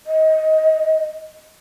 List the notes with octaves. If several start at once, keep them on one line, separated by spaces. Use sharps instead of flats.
D#5